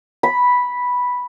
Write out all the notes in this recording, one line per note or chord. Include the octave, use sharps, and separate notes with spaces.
B5